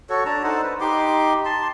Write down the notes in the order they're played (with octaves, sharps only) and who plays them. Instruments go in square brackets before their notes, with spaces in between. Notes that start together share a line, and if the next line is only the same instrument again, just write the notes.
[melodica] F#4 A4 C#5
D4 A5 A#5
D#4 A4 C5 F#5
B4
D#4 G4 C6 D6
A5 C6